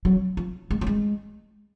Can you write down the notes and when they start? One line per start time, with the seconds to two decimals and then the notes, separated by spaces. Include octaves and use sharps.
0.05 F#3
0.37 F3
0.71 G#3
0.81 F#3
0.87 G#3